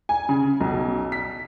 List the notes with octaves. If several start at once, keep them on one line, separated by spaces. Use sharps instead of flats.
G#5
C#3
B1
B6